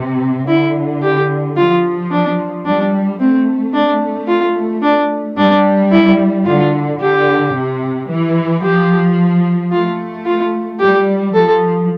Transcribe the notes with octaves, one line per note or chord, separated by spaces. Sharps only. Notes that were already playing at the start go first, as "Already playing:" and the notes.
Already playing: C3
D3 E4
G4
F3 F4
D4
G3 D4
A3 C4
D4
F4
D4
G3 D4
E4
D3 F4
D3 G4
C3
E3
F3 G4
A3 F4
F4
G3 G4
F3 A4